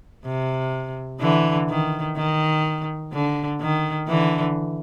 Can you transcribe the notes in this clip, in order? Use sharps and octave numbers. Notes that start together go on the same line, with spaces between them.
C3
D3 E3
D#3
D#3
D3
D#3
D3 E3